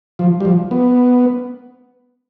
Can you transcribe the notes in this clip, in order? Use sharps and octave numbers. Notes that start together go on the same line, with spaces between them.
F3
G3
F3
B3